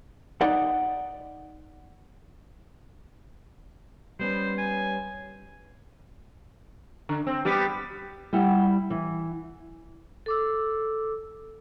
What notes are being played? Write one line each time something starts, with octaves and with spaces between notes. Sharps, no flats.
D#4 D5 F#5
G3 B3 C#4 C5
G#5
D3
C4
G3 B3 G4
G3 E4 G4 F#5
E3
A4 D6 E6